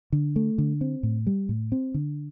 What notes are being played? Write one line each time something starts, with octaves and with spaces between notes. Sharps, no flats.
D3
A3
D3
C4
A2
G3
A2
C4
D3